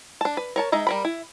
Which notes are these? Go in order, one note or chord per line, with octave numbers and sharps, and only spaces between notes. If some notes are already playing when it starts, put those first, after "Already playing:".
D4 A5
B4
A#4 C#5 A5
G#3 D#4 E5 A#5
G3 A#4 B5
E4